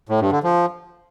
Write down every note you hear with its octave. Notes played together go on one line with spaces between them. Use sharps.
A2
G2
D3
F3